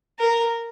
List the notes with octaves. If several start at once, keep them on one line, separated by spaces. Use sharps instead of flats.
A#4